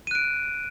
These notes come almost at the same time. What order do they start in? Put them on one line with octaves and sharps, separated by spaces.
D#7 F#6 D7